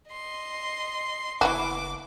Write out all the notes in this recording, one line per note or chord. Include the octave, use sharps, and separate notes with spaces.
D#5 C6
F#1 E3 B3 F#4 D6